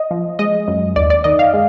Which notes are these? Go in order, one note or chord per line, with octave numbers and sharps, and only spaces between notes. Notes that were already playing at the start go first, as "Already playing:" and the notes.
Already playing: D#5
F3
G#3 D#5
F#2
D#2 D5
D5
D#3 D#5
F5
G#3